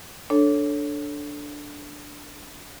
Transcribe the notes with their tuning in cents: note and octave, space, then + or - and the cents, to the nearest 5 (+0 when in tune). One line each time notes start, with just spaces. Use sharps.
D4 +0 A4 +0 C#5 +0